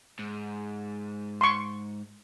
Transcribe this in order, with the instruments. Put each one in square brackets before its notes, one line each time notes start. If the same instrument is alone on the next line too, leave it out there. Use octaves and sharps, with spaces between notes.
[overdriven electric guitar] G#2
[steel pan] C6 C#6